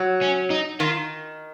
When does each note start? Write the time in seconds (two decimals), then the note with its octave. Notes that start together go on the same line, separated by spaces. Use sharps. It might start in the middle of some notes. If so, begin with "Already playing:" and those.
Already playing: F#3
0.22 C#4
0.50 D#4
0.80 D#3 F4